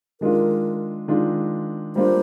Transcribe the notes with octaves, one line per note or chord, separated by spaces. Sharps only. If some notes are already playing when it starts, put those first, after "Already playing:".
D#3 G#3 D4 F4 A#4
D#3 G#3 D4 F4
G3 A#3 D4 F4 C5